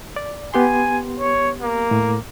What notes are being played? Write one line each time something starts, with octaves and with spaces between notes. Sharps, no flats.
D5
B3 G4 G#5 C6
C#5
A#3
A2